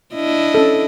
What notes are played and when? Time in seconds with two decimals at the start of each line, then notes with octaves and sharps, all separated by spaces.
0.14 D4 E4 D#5
0.54 C#4 A4